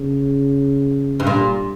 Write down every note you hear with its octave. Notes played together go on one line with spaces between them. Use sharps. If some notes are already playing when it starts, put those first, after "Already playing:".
Already playing: C#3
G2
A#2